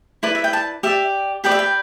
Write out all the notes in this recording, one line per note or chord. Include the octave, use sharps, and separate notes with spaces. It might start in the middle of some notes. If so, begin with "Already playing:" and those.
E4 B4 D5
E5
G5
A5
G4 D5 E5
G4 B4 D5 G5
E5
G5